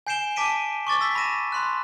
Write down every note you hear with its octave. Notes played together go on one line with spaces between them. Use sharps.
G#5 G6 C7 D7 E7 G7
A5 D6 B6 D7 D#7
C#6 D6 A6
E6 A6 B6
B5 A#6 D#7 E7
B5 C6 F#6